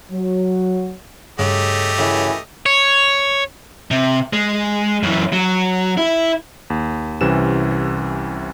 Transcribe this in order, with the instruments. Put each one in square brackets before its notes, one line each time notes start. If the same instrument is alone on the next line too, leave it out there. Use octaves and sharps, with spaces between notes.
[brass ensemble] F#3
[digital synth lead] G2 [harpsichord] C#3 [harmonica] A3 G4 D#5
[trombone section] F#2 E3 [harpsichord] C#3
[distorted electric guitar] C#5
[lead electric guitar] C3
G#3
F#2 E3
F#3
E4
[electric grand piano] D#2
C2 C3 E3 C#4 E7